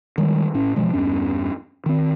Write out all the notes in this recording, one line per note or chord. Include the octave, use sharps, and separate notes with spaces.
D#3 G3 G#3
A2 C#4
B2 E3 F3 G#3
E2 G2 C#4
D#3 C4